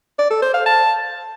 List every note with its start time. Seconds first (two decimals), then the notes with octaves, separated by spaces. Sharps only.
0.19 D5
0.31 A4
0.42 C5
0.54 F5
0.66 A5